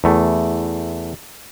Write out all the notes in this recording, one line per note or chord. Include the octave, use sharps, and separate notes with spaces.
E2 A3